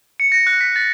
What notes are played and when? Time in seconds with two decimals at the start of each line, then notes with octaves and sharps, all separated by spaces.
0.20 C#7
0.32 A#6
0.47 F#6
0.61 B6
0.76 A6